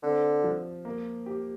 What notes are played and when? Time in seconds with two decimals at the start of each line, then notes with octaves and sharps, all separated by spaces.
0.03 D3 C4
0.44 F3
0.85 A#3
1.26 G4